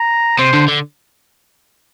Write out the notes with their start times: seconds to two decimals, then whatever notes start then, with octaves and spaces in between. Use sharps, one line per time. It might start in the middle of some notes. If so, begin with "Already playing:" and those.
Already playing: A#5
0.38 C3 C5
0.53 D3
0.68 D3